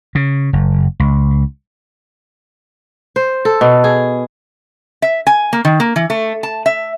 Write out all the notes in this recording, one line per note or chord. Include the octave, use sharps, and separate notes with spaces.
C#3
F#1
C#2
C5
A4
B2
G#4
E5
G#5
A#3
D#3
A#3
E3
A3
A5
E5